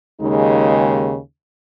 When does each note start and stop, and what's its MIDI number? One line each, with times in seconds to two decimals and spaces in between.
0.21 1.18 39
0.21 1.18 49
0.21 1.18 56
0.21 1.18 63